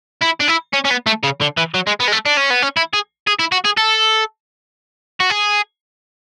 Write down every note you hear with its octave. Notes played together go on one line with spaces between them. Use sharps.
E4
D4
E4
C#4
C#4
B3
A3
C#3
D3
E3
F#3
G#3
B3
G#3
A3
D4
C#4
B3
C#4
E4
G#4
G#4
E4
F#4
G#4
A4
F#4
G#4